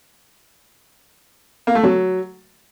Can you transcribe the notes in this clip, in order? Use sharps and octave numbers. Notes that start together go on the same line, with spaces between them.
A#3
A3
F#3